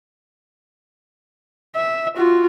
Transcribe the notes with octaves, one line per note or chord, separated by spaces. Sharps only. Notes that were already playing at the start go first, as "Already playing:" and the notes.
E5
F4 F#4